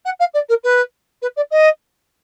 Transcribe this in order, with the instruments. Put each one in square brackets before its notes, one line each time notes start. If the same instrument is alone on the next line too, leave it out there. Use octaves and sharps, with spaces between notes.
[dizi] F#5
F5
D5
A#4
B4
B4
D5
D#5